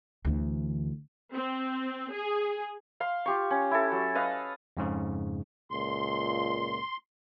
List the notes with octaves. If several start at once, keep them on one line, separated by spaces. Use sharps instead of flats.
D2 E3
C4
G#4
F5 C6
F4 G4 C#6
C#4
E4 A4
F#3
B4 D#5 F5
F2 G#2 C#3
C#2 A#2 C6